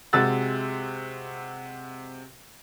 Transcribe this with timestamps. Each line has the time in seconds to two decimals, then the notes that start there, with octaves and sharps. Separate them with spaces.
0.13 C3 G#3 F#4 E6 F#6 A6